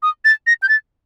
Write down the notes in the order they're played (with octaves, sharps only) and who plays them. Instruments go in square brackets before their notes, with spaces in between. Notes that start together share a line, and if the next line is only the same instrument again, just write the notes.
[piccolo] D#6
A6
A#6
G6
A6